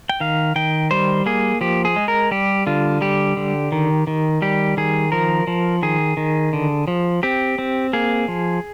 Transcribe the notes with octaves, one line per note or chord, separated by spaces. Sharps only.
G5
D#3 F5
D#3 G5
G3 C5
A#3 G#4
F3 G4
G#4
G#3
A#4
G3 G4
D3 F4
G3 G4
D3
D#3
D#3
G3 G4
D#3 G#4
F3 A#4
F3
D#3 G#4
D#3
D3
F3
C4 G4
C4
A#3 G#4
F3